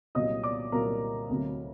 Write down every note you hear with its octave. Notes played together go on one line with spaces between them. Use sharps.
C2 A#2 F#3 D#5 D#6
D5 D6
C2 A#2 F#3 A#4 A#5
D2 C3 F#3